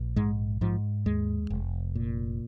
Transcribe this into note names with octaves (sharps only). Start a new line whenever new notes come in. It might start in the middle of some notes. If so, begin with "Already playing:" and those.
Already playing: A#1
G#2 G#3
G#2 F3
D#2 G#3
F1
A#2